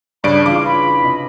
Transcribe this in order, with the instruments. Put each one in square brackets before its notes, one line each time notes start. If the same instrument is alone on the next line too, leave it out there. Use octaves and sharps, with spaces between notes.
[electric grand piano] G2 D5 D7 [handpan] C#3 D4 C#5 [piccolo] B5
[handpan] E3 F4 [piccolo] F5 [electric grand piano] D6
[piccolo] B5
[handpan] C3 D#5